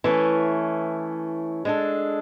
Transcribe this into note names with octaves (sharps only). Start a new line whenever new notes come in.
E3 A3 C#4
G#3 D4 A4